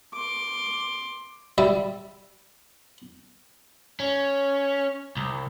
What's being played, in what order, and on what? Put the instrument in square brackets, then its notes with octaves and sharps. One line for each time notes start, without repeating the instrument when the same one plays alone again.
[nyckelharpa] C6 D6
[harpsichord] G3 E5
[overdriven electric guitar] C#4
C2